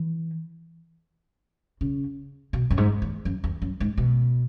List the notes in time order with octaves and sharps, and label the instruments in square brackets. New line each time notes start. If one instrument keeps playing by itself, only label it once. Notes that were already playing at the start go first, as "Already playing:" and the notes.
Already playing: [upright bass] E3
C#3
B2
F#2
G#2
E2
F#2
E2
F#2
G#2
B2